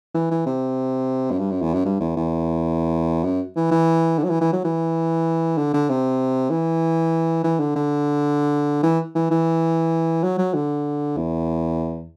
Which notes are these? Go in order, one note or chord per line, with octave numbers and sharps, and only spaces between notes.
E3
E3
C3
F#2
G2
F#2
E2
F#2
G2
E2
E2
F#2
E3
E3
D3
F#3
E3
E3
F#3
E3
D3
D3
C3
E3
E3
D3
D3
E3
E3
E3
F#3
F#3
D3
E2